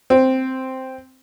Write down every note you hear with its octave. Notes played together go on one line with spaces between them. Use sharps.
C4